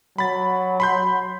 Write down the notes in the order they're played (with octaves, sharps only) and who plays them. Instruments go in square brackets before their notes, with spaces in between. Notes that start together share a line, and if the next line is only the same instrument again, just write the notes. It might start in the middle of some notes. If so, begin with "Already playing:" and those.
[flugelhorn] F#3 [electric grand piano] B5 A6
[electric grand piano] B5 C6 G6